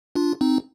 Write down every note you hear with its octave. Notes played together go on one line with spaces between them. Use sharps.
D4 F4
C4 D#4